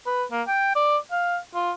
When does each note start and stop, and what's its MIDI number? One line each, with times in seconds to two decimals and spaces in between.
0.06 0.24 71
0.31 0.42 58
0.48 0.75 79
0.76 0.97 74
1.11 1.38 77
1.55 1.72 65